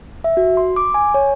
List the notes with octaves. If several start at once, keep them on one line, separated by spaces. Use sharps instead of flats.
E5
F#4
C6
D6
G#5
C#5